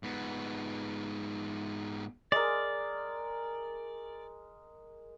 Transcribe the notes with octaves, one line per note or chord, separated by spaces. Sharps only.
G#2 B3
G#3 A#4 D5